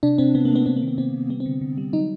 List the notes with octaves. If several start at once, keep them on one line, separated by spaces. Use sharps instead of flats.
C3 D4
C3 C4
C3 B3
A#3
A3 B3
C3 C4
A#3
D#3
B3
C3 C4
C3
G3 B3
C4
D3
D3
G3
F#3 D#4